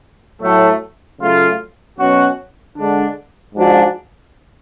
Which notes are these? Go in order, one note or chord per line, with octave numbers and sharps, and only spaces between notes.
A2 F#3 A3
C#3 F#3 A3 F4
B2 F#3 C#4 F#4
D3 G#3 D4
G#2 F3 G#3 D4 F#4